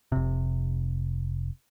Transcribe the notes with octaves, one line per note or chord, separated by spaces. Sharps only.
F1 C3